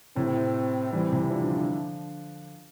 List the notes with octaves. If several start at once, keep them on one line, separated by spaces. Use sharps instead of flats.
A2 C3 C4
E3 G3 C4
C3 E3
D3 F3 D4
D3 F3
D3 F3